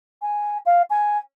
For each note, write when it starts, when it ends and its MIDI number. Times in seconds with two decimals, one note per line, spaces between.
0.22 0.58 80
0.66 0.82 77
0.90 1.18 80